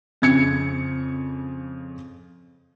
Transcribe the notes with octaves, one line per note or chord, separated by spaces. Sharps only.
F2 C#3 G#6 C#7